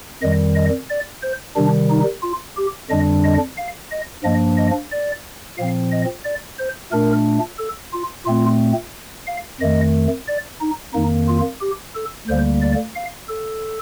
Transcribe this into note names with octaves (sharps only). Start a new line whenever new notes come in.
F2 D#3 G3 D#5
D#5
D5
C5
C3 D#3 G3 D4
D#4
F4
G4
F2 D3 G3 D4 D#5
D#5
F5
D#5
G2 F3 A#3 D4 D#5
D#5
D5
A#2 F3 C4 F5
D#5
D5
C5
A#2 A3 D4 A#4
A4
F4
A#2 A3 C4 F4
F5
F2 D#3 A3 D#5
D5
D#4
F2 D#3 A#3 D#4
F4
G4
A4
D2 D3 G3 A#3 C5
D5
F5
A4